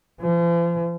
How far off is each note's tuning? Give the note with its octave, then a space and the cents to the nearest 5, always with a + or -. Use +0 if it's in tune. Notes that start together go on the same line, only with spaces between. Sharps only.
F3 -40